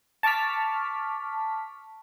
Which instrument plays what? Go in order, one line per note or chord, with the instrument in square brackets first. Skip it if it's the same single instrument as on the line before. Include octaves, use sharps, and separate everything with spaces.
[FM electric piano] A5 C#6 D6 F6 B6